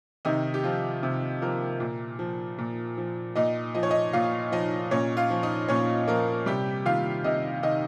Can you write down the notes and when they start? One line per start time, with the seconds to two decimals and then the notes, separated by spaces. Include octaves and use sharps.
0.25 C3 D#3 D#4
0.54 G4
0.64 F3 F4
1.03 C3
1.42 F3 A#3 A#4
1.80 A#2
2.19 F3
2.58 A#2
2.97 F3
3.35 A#2 D#4 D#5
3.75 F3 D#5
3.83 C#5
3.91 D#4 D#5
4.13 A#2 F4 F5
4.52 F3 D#4 D#5
4.91 A#2 C#4 C#5
5.17 F4 F5
5.30 F3
5.43 D#4 D#5
5.69 A#2 C#4 C#5
6.08 F3 A#3 A#4
6.46 C3 G3 G4
6.86 D#3 F4 F5
7.24 C3 D#4 D#5
7.63 D#3 D#4 D#5